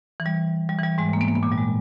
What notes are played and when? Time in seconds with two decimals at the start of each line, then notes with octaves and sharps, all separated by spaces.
0.20 E3
0.26 G3
0.69 G3
0.78 E3
0.84 G3
0.98 G#2 G#3
1.13 A#3
1.21 B3
1.28 A#3
1.35 B3
1.43 A#2 A#3
1.52 G3
1.58 G#3